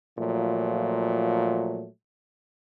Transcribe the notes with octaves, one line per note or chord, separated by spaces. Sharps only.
A#2 F3 F#3 A3